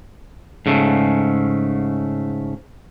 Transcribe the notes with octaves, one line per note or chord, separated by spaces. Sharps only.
G#2 C#3 A3